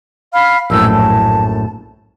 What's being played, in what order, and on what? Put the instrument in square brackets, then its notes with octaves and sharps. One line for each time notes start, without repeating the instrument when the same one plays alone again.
[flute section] F5 B5 F6
[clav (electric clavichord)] A#1 F#2 A2 [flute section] E6
[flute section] A5